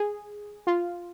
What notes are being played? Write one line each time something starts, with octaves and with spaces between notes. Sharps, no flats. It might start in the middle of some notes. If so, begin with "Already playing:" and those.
Already playing: G#4
F4